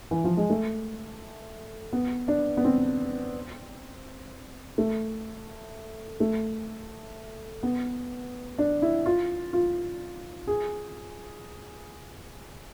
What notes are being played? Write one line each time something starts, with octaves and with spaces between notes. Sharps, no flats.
E3
F3
G#3
A3
B3
D4
B3
C4
A3
A3
B3
D4
E4
F4
F4
G#4